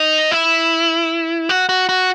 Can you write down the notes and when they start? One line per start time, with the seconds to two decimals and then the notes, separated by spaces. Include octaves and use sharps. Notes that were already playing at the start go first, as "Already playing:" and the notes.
Already playing: D#4
0.31 E4
1.49 F#4
1.69 F#4
1.89 F#4